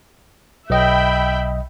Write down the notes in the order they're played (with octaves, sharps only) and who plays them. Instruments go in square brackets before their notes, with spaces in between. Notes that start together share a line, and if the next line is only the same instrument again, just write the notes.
[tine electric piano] B1 D#5 [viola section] E5 G5 B5